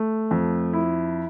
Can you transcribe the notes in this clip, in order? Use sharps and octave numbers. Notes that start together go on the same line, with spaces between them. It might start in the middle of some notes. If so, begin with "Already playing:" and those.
Already playing: A3
F2
E4